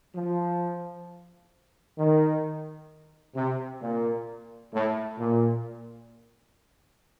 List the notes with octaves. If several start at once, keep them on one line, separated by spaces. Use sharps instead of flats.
F3
D#3
C3
A#2
A2
A#2